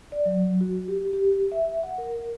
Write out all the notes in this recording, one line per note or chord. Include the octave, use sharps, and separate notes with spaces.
D5
F#3
F#4
G4
G4
E5
F#5
A#4